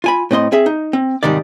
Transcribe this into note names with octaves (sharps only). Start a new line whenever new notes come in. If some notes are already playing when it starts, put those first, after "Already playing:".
F4 G#5 B5
A2 C4 D#5 C6
C4 G#4 E5
D#4
C4
G#2 C3 D#3 G3 D5